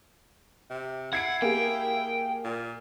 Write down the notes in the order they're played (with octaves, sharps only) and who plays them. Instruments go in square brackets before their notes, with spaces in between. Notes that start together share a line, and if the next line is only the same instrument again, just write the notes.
[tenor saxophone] C3
[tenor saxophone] E4 [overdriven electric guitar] F#5 [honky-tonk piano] G#6 C7 D7
[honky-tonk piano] A#3 G4 G#4 [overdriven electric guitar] G5
[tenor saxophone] A#2